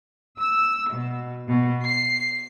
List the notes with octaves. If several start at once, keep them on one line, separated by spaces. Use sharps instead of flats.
E6
B2
B2
C7